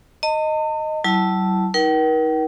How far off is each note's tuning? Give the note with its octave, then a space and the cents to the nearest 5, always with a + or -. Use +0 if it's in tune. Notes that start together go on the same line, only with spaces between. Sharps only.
D#5 +0 A5 +45
F#3 +40 E4 +0 A5 +0
D#4 +35 A#4 +40 G5 -40